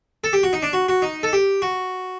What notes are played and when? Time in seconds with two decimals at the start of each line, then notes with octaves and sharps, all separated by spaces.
0.24 A4
0.33 G4
0.43 F#4
0.53 D#4
0.63 D4
0.73 F#4
0.89 F#4
1.02 D#4
1.23 A4
1.33 G4
1.62 F#4